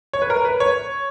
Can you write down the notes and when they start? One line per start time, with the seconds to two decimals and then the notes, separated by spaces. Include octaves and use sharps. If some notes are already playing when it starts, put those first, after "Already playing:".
0.13 C#5
0.22 B4
0.30 A#4
0.45 B4
0.60 C#5